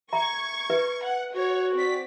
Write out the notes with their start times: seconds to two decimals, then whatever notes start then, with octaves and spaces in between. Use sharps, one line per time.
0.13 E5 A#5 C#6 G#6
0.70 B4 E5
1.04 F#5
1.35 F#4 C#5
1.75 C4 D5 B6